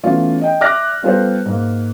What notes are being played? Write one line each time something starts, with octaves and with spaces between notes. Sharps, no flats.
E3 A3 B3 C#4 F4
D#5 G5
D5 E5 D6 F6 F#6 A#6
G3 B3 F4 A4 B4 C5
G#2 A#3